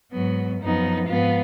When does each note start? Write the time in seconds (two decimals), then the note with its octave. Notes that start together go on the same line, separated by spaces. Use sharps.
0.13 G#2 F#3 B3
0.61 F#2 F3 B3 D#4
1.08 G#2 F3 B3 F4